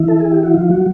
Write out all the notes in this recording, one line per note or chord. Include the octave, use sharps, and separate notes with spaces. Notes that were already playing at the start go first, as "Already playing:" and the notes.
Already playing: E3 E4
A4
G#4
G4
F#4
F3 F4
F#3 F#4